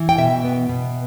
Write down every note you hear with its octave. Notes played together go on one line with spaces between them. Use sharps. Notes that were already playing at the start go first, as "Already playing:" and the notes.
Already playing: E3
G5
B2 E5
B3
B2